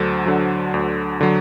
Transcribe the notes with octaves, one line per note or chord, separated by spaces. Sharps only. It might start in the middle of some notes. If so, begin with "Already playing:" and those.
Already playing: D2 D3 F#3 A4 C5
D3 F#3
D2
D3 F#3